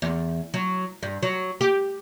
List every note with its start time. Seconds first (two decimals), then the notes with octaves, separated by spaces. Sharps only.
0.02 E2
0.54 F#3
1.03 G2
1.23 F#3
1.61 G4